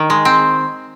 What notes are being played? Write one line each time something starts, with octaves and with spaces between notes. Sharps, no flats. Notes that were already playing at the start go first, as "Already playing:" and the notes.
Already playing: D#3
G#3
C4